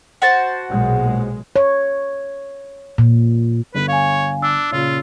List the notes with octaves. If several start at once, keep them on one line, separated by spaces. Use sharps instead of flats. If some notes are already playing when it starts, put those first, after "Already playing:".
F#4 C5 A5
B1 A#2 G#3
C#5
A#2
G1 B4
C#5 F5 G#5
D4 E6
A#2 C#3 F4